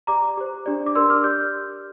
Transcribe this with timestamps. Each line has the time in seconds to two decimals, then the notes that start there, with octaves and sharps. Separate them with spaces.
0.07 G4 D5 A#5 D6
0.37 G4 C5
0.66 D4 G4 D5
0.86 D6
0.95 D4 G4 A#4 D5 C6 E6
1.10 D6 F6
1.24 G4 D5 G6